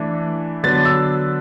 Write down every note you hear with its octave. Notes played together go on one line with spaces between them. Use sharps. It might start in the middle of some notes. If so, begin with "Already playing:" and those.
Already playing: E3 A3 D4
D3 F#3 B3 D4 A6
E6